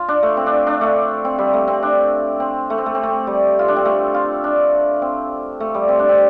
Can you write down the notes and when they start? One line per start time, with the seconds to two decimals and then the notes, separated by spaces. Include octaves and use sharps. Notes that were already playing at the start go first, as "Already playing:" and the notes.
Already playing: F4
0.08 D4
0.23 A3
0.37 C4
0.46 D4
0.67 D4
0.81 A3
1.25 C4
1.39 G3
1.53 A3
1.68 C4
1.83 D4
2.40 C4
2.70 A3
2.78 C4
2.86 A3
2.95 C4
3.03 A3
3.27 G3
3.59 F4
3.68 D4
3.76 C4
3.85 A3
4.14 F4
4.44 D4
5.02 C4
5.60 A3
5.75 G3
5.89 C4
5.99 D4
6.09 C4